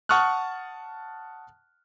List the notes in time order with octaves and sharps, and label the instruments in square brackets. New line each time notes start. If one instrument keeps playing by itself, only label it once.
[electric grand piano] F#5 A5 C#6 D#6 F6 F#6